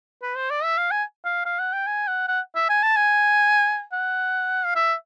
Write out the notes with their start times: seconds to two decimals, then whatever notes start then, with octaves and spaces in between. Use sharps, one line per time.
0.22 B4
0.36 C5
0.50 D5
0.63 E5
0.78 F5
0.91 G#5
1.25 F5
1.45 F5
1.59 F#5
1.73 G5
1.87 G#5
2.08 F#5
2.28 F#5
2.56 E5
2.69 G#5
2.83 A5
2.97 G#5
3.92 F#5
4.65 F5
4.76 E5